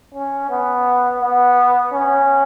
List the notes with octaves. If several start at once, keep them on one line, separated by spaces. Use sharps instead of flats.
C#4
B3
B3
C#4